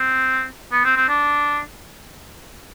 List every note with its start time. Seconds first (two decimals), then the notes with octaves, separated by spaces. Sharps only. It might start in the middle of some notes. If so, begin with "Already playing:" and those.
Already playing: C4
0.72 B3
0.85 C4
0.96 C4
1.08 D4